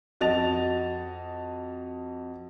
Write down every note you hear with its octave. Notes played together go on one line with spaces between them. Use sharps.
F2 F#4 D#5 A5 A6 F7